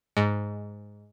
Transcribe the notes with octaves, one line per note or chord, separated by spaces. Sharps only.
G#2